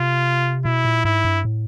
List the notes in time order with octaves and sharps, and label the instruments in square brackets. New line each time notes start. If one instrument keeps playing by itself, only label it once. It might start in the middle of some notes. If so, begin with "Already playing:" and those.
Already playing: [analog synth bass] C3 [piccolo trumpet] F4
[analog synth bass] B2 [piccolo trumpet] E4
[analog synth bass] A#2
[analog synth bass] G#2 [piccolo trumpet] E4
[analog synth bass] G2
A2